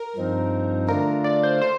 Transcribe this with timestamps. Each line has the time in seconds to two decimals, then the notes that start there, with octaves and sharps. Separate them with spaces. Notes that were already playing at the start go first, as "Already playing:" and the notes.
Already playing: A#4
0.16 G2 F3 C4 D#4
0.89 D3 A3 D4 F4 A#4
1.24 D5
1.43 C5
1.62 C5